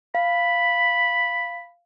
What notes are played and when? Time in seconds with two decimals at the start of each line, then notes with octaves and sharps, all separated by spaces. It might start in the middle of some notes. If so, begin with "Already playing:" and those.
0.15 F5 B5